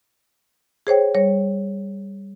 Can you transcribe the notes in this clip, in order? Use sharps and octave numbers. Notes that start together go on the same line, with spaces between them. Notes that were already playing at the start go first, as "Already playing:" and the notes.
G#4 C5 C#5 G5
G3 C#5